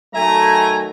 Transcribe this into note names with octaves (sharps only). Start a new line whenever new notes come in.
D#3 F#3 A3 E5 G#5 A#5